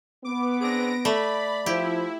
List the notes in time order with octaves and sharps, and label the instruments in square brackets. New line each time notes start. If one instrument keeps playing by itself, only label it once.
[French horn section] B3 [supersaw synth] D6
[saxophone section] C4 D4 G#4 [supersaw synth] A#6 D7
[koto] A3 [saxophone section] D5 [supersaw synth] B5
[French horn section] F3 [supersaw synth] E4 [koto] G4